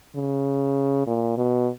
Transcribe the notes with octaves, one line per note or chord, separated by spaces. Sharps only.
C#3
A#2
B2